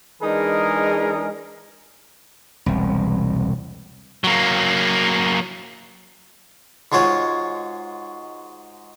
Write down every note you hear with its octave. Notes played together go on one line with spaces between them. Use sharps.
E3 G#3 D4 D#4 G#4 A#4
E1 C2
F#3 A#3
G#2 G#3 F4 F#4 C#5